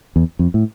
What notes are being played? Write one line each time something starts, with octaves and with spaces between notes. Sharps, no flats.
E2
F2
A2